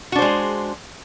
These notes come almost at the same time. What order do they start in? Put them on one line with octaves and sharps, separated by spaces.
F#4 D4 C5 G#3 G#4